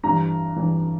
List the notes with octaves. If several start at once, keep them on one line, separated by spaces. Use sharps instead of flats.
G2 E3 A#5
G2 E3